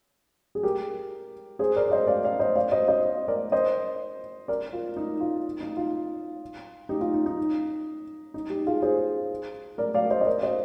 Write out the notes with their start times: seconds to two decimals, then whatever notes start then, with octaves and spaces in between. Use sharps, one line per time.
0.55 G#4
0.63 G4 A#4
1.59 G#4 C5
1.76 A#4 D5
1.88 D5
1.92 C5 D#5
2.07 D5 F5
2.24 D5 F5
2.40 C5 D#5
2.56 D5 F5
2.72 C5 D#5
2.88 C5 D#5
3.28 A#4 D5
3.52 C5 D#5
4.48 A#4 D5
4.73 F4
4.97 D#4
5.20 F4
5.61 D#4
5.77 F4
6.89 D#4 G4
7.01 F4
7.14 D#4
7.26 D#4
8.34 D#4
8.50 D#4 G4
8.66 F4 G#4
8.82 G#4 C5
9.78 A#4 D5
9.94 D5 F5
10.11 C5 D#5
10.21 D#5
10.26 A#4 D5
10.43 C5 D#5